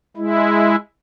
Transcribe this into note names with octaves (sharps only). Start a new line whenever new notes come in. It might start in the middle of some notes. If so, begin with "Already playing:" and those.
G#3 E4